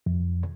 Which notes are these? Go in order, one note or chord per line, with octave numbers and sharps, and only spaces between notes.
F2